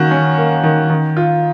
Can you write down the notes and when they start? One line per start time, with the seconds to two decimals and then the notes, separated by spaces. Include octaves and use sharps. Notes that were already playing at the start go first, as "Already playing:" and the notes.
Already playing: D#3 A#3 C#4 F#4
0.11 C#4
0.38 A#3
0.63 D#3
0.90 D#3
1.17 F4